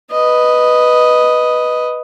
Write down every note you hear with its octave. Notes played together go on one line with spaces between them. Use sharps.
B4 D#5